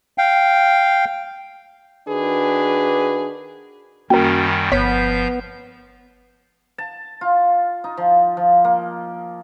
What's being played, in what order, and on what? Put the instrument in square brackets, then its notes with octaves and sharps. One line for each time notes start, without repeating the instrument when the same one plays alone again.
[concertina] F5 G5
[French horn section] D#3 D4 F#4 G#4 B4
[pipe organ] F#2 D#3 G3 [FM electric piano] A#3 C#4 F#4 [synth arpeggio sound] A#4 G5
[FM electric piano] G1 B6 C7 [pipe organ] F3 G6 [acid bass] B3 [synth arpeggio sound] C#5
[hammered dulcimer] A5
F4
D#4
F3
F3
A#3